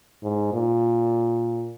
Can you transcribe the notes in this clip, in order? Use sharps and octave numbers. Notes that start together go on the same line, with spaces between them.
G#2
A#2